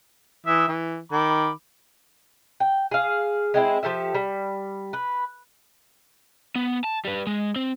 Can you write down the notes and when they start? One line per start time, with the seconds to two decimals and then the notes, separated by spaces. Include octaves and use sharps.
0.46 E3 E5 D#6
0.68 E3
1.12 D#3 B5 D6
2.60 G5
2.91 G#4 F5
3.54 G#3 C4 E4
3.83 F3 G4 A4 E5
4.14 G3
4.93 B4
6.56 B3
6.84 A5
7.05 G3 B4
7.27 G#3
7.56 C4